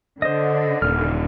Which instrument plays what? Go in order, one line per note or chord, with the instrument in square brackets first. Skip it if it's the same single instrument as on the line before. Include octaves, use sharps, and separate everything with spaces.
[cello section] D3 [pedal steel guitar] C5 D#5
[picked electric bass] D#1 [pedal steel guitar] F6